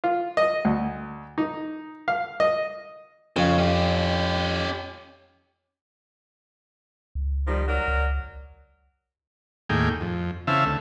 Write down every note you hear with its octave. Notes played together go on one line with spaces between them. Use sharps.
F4
D#5
D2
D#4
F5
D#5
F2 C#3
C#4 G4
C#2
D#3 F3 G3
F#3 A#4 D5
C#2
D#2 A2 A#3 G#4 G5
F2
C#3 E3 C4 E5 F5 A5
D2 A3